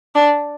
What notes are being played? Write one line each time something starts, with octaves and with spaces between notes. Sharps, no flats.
D4